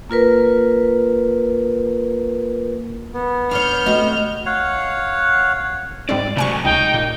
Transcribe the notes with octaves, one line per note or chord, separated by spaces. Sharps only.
A#3 F4 A#4 B4
B3
D4 C5 C#5 F6 G6
A3 C4 F#4 D#5
C#5 F5 F#5
G#2 G3 C4 D5
A2 C3 F#3 G#5 C#6
C#2 D#4 G5
A#2